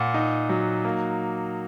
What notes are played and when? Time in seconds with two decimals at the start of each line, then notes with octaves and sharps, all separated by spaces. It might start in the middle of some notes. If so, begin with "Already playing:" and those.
Already playing: A#2 F#5
0.14 D#4
0.49 F#3
0.85 A#3